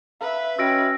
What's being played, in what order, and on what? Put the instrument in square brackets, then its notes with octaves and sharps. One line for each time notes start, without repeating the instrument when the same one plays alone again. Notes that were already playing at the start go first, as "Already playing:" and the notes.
[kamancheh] B4 E5 [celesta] F5
[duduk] C#4 [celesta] F#4 D#5 G5 [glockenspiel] E6 A#6 D7